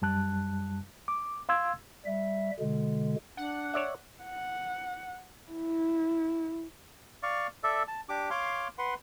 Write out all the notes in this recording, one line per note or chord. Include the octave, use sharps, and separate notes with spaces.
F#2 G3 A5 F#6
D6
F5 C6 E6 G#6
G3 E5
B2 D3 G#3
D4 F#5
C#5 D5 E5
F#5
E4
D5 F5 C#6
A4 D5 E5
A5
D4 G4 D6
C#5 F5 C6 D6
B4 F#5 C6